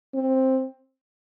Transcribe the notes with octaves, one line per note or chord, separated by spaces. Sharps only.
C4